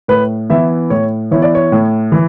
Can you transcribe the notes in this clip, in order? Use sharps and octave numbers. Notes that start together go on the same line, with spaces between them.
A2 B4
E3 B3 E4 E5
A2 C#5
E3 B3 E4 C#5
D5
C#5
A2
E3